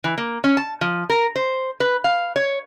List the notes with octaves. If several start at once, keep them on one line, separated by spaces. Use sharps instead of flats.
E3
A#3
C#4
A5
F3
A#4
C5
B4
F5
C#5